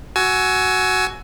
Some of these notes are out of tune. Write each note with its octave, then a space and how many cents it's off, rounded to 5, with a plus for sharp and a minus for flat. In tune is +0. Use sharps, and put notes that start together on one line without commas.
F#4 +5 G#5 +25 E6 +0